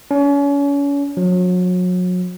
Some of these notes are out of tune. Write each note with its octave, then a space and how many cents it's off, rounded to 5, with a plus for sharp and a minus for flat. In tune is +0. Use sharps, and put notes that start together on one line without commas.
C#4 +35
F#3 -35